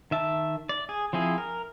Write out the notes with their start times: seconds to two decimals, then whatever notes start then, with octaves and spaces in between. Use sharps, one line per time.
0.11 D#3 E5 A5
0.69 D5
0.89 G#4
1.13 F3 C4 E4 G#4
1.38 A#4